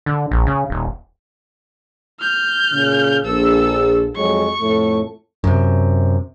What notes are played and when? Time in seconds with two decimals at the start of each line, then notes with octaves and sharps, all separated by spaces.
0.06 D3
0.31 A#1
0.47 C#3
0.70 D#1
2.20 F6 G6
2.72 A#2 C#3
3.24 A#1 A4 E6
4.16 F2 F#3 G#3 C#6
4.61 F2 A2 A3
5.44 F#2 C3